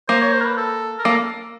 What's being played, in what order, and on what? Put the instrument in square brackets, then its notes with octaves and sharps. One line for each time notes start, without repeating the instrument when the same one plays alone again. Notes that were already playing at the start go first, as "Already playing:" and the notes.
[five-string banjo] A#3 [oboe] C5
[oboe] C#5
C5
A#4
B4
A4
A#4
[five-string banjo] A#3 [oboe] A4